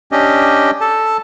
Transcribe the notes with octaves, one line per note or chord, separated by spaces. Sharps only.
C#4 D4 G4 D#5
A4 A5